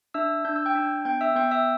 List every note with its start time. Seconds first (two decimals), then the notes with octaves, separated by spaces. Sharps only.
0.14 D4 E5 E6
0.45 D4 G6
0.56 E6
0.66 G5 G6
0.75 D4
1.05 B3 G5 G6
1.21 E5 E6
1.36 B3 G5 G6
1.51 E5 E6